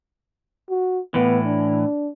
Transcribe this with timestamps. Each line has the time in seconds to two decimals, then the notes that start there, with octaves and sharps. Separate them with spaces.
0.70 F#4
1.14 A2 E3 B3
1.45 D4